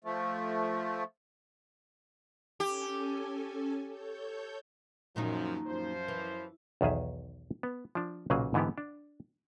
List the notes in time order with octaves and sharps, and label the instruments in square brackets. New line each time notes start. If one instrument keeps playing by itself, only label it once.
[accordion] F3 A3
[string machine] C#4 A4 G#5 [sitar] G4
[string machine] A4 C#5 G6
[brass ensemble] F#2 F3 [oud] A#2 D#3 D#4
[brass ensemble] F#2 F3 C5
[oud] E3
[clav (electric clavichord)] B1 E2 D#3 G#4 E5
B3
F3 D4
B1 A#2 C#3 F#3 A#3 G#4
G#2 D3 E3 G#3 B3 G4
D4